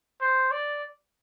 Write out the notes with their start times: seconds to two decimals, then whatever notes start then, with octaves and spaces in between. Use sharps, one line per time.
0.21 C5
0.51 D5